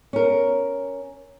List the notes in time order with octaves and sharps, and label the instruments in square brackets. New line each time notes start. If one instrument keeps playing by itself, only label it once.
[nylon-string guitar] C#4 A#4